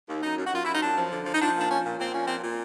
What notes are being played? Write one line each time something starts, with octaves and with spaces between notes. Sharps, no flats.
D#2
F#2 D#4
F#2
F#4
F#2 F4
F#2 E4
D#4
F#2 D4
F3
D3
F3
D#4
F3 D4
A#2
D4
F3 C#4
A#2
A#2 C4
F3 C#4
A#2 C4
A#2